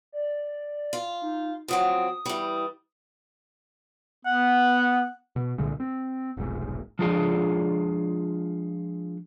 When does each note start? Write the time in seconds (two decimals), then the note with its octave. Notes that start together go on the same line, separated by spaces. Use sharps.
0.12 D5
0.93 F4
1.22 D#4
1.68 F3 F#3 C4 D#6
2.26 E3 G3
4.25 B3 F#5
5.36 B2
5.58 C2 A#2 D3 G#3
5.80 C4
6.37 F1 B1 G#2
6.99 F3 G#3 D4 F4 G#4